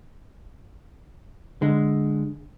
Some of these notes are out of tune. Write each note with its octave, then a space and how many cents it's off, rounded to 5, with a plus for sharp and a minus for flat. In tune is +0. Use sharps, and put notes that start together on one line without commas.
D3 +5 G#3 +0